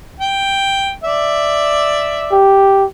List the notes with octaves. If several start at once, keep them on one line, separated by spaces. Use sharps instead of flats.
G5
D5 E5
G4